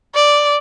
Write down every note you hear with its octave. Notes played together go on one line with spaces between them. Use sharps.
D5